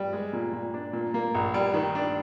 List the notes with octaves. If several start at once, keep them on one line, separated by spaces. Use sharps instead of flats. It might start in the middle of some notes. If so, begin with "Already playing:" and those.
Already playing: G3
G#3
A#2
A#2
D4
A#2
A#3
A#1
G3
D#3
D4